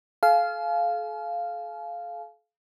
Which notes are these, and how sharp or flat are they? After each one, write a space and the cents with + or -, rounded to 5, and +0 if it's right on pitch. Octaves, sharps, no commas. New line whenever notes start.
A4 -40 F5 -5 G#5 +45